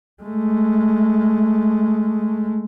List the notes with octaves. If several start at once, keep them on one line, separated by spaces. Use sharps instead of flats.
G#3 A3